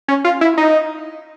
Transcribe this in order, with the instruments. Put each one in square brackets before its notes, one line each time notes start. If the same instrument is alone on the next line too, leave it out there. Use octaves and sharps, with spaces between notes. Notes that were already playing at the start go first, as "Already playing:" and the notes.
[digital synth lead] C#4
F4
E4
D#4